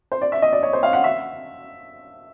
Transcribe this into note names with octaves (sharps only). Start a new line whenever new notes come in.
C5
D5
E5
D#5
D5
C#5
C5
F5
F#5
E5